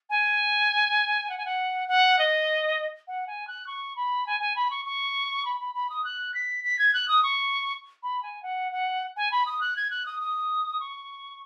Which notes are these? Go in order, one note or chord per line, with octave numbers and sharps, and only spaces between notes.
G#5
F#5
G#5
F#5
F#5
D#5
F#5
G#5
F#6
C#6
B5
G#5
G#5
B5
C#6
C#6
B5
B5
B5
D#6
F#6
B6
B6
G#6
F#6
D#6
C#6
B5
G#5
F#5
F#5
G#5
B5
D#6
F#6
G#6
F#6
D#6
D#6
C#6